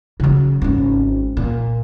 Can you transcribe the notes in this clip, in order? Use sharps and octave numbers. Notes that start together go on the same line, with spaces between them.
C#3 F#3
G#1 C#4
A#2